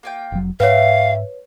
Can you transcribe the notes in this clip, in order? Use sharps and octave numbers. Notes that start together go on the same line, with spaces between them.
A#3 F4 G5
F1 F#3
G#2 E4 F#4 G4 B4 C#5 F5